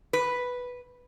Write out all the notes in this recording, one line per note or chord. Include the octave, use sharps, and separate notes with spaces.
B4